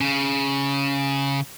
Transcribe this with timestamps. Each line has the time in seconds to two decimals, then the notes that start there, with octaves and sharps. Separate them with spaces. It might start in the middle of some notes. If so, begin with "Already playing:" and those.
0.01 C#3